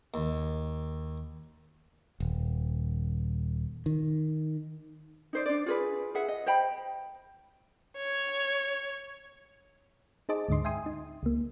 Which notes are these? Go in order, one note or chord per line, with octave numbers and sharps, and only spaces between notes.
D#2
D#1
D#3
D#4 C5 D5
D4 D5
F4 G#4 B4
G#4 B4 E5 F#5
D#5
C5 D#5 G5 B5
C#5
D#4 G#4 C5 D#5 A5 D6
D2 G#2 D3 D#5 C6
E5 G5 G#5 C6 D#6
D#4
C#2 A#3